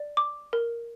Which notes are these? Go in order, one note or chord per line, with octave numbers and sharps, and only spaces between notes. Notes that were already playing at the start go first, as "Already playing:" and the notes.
Already playing: D5
D6
A#4